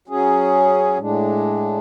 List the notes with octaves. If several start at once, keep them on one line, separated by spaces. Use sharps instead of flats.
F#3 C#4 G#4
A2 G#3 D4